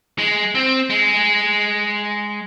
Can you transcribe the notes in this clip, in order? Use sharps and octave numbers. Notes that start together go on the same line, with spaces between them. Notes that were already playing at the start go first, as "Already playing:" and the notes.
G#3
C4
G#3